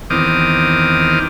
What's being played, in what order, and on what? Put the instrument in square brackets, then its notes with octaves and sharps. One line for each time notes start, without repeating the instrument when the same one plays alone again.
[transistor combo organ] E2 D#3 C4 D6 D#6 F6